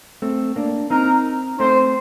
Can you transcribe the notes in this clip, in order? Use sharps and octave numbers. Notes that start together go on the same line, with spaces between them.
A3 C4
A#3 D4
C4 D#4 A#4
A3 C4 C5